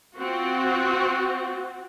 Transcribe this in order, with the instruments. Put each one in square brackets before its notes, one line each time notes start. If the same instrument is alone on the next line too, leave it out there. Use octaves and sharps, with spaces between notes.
[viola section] C4 F4 F#4